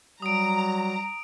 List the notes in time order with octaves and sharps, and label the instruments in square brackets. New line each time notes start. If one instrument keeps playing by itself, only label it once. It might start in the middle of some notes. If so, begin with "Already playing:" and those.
[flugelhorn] F#3 [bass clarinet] G3 [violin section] A#5 [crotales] D#6 D7